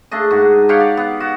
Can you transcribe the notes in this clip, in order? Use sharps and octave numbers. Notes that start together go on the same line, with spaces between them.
A3 D4 G#4 D#5
G#2 F#4
G4 C#5 F5 F#5
D5
B3
F#4